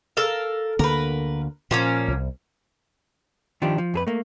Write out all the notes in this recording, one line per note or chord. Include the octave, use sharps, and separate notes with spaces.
A4 A#4 F5
D2 D3 A#3 A#4 B4
A#2 F3 A#3 C#4
C2
D#3 F3 D4 G4
F3
F2 G#4 B4
A3 A#3